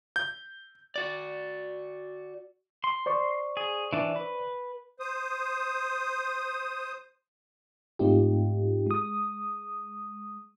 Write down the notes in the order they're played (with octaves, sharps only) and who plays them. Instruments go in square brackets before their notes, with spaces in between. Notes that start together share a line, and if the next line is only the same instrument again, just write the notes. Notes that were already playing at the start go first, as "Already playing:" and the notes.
[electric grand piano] G6
[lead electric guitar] F#4 D5
[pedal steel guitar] C6
[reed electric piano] C5 D5 C#6
[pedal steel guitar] G#4
E3 D4
B4
[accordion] C5 D#6
[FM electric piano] G#2 A3 C4 D#4 F4 G4
G#3 D#6